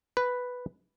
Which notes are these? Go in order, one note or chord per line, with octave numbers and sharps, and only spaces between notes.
B4